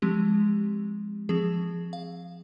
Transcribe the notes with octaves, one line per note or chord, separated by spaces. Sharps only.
F3 G#3 C4 G4
F3 C4 G#4
F5